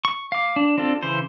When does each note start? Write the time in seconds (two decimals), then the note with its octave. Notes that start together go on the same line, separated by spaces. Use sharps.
0.05 C#6
0.32 F5 D6
0.56 D4
0.78 C4 D4 F4 A4
1.03 C#3 E3 C5